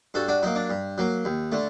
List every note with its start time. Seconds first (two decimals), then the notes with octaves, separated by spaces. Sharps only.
0.14 G2 F#4 A4
0.28 D4 F#4
0.43 F#3 A#3 D#4
0.56 D4
0.70 G2
0.98 F#3 A#3
1.25 D#2
1.52 D3 A3